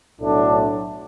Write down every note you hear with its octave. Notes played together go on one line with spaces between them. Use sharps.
B1 A2 F#3 A3 D4